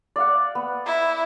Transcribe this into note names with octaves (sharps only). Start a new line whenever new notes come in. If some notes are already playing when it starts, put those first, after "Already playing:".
D5 F5 F#5
B3
E4